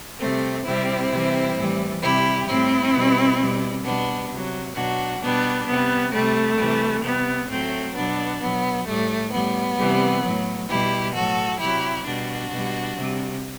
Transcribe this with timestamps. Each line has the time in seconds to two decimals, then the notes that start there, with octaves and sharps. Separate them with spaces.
0.20 C3 G3 A3 C4
0.65 C3 G3 C4 E4
1.10 C3 E3 G3
1.57 A2 E3 G3
2.02 C3 G3 E4 G4
2.48 A2 G3 C4 E4
2.94 B2 G3
3.40 B2 G3
3.84 B2 G3 B3 D4
4.30 C3 F#3
4.76 B2 F#3 D4 F#4
5.21 B2 G3 B3 D4
5.68 C3 G3 B3
6.13 C3 G3 A3
6.58 C3 E3 G3
7.04 C3 G3 B3
7.49 A2 F#3 A3 C4
7.95 B2 F#3 B3 D4
8.41 B2 F#3 B3
8.87 A2 G3 A3
9.33 A2 G3 B3
9.78 C3 E3 G3
10.24 A2 F#3
10.69 B2 G3 E4 G4
11.15 A2 F#3 F#4 A4
11.60 C3 F#3 E4 G4
12.06 B2 G3 D4 F#4
12.52 B2 G3
12.97 C3 G3